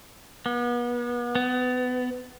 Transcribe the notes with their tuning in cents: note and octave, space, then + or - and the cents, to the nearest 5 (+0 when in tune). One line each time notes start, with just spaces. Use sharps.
B3 -35
B3 +25